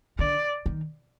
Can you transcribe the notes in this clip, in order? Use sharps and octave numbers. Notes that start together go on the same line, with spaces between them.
D3 D5
D#3